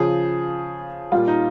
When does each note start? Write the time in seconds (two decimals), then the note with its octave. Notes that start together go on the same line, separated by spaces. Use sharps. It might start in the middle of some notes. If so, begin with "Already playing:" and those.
Already playing: C#3 F3 G#4
1.12 A#2 G3 F4
1.28 D#4